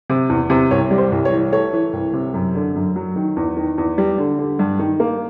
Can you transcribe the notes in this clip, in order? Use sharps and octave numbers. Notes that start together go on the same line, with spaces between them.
C3
E2
C3
C2 C#5
G3
C5
C2
C#5
E3
A3 C#5
E3
C2
C3
F#2
D3
F#2
F#3
D#3
E2
D#3
E2
G3
D3
D3
G2
D#3
A#3